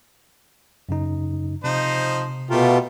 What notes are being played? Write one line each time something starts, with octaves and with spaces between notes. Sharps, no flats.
F#2 C#3 D#4
C3 F3 D#4 C5
B2 A3 F4 G4 A#4